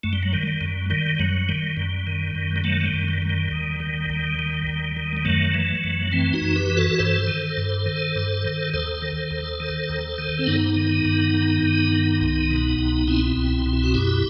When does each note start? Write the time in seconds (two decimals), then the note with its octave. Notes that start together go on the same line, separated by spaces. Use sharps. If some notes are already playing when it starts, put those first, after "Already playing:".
0.03 F#2 A3
0.13 G3
0.23 F#3
0.33 D#3 G3
0.47 G3
0.61 F#2
0.90 D#3 G3
1.19 F#2 F#3
1.49 D#3 G3
1.77 F#2
2.07 D#3
2.35 F#2
2.56 G3
2.64 D#3 F#3 A3
2.81 A3
2.86 G3
2.93 F#2
3.08 G3
3.22 D#3
3.29 G3
3.51 D#2
3.80 D#3
4.10 D#2
4.39 D#3
4.67 D#2
4.96 D#3
5.17 G3
5.25 F#2 F#3 A3
5.54 E3
5.84 F#2
6.12 E3 A3 C4
6.33 D#4 F#4
6.41 F#2
6.56 G4 B4
6.70 E3
6.77 F#4 A4
6.98 G2 A4 C5
7.28 D#3
7.57 G2
7.86 D#3
8.16 G2
8.45 D#3
8.74 D#2 A4 C5
9.02 D#3
9.31 D#2
9.60 D#3
9.89 D#2
10.18 D#3
10.39 C4
10.46 G2 B3 D#4
10.76 D#3
11.05 G2
11.34 D#3
11.63 G2
11.92 D#3
12.21 C2
12.50 B2
12.79 C2
13.07 B2 C4 E4
13.37 C2
13.66 B2
13.73 E4
13.84 F#4
13.94 F#2 E4 G4